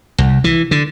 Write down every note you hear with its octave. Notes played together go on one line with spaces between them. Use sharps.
C2
E3
D3